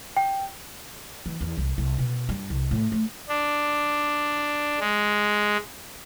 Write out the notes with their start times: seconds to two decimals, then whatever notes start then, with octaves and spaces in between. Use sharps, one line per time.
0.17 G5
1.26 E3
1.41 E2
1.57 C2
1.78 C2
1.98 B2
2.29 G2
2.50 C2
2.71 A2
2.92 A3
3.28 D4
4.80 G#3